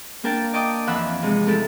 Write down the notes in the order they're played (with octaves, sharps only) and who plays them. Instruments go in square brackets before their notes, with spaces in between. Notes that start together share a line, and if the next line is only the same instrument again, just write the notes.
[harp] A#3 D4 A#4 G5 A5
D5 D#5 G5 D6 D#6
F2 E3 F3 F#5 B5 E6
C3 G#3
A3 D#4 E4 G4 A4